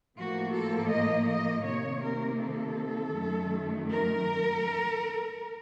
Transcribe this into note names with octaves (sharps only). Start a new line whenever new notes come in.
A2 F3 A#3 F#4
A4
D#5
D#5
C3 D#3 A#3 C#5
A#4
A4
F#2 D#3 F#3 A3
A#4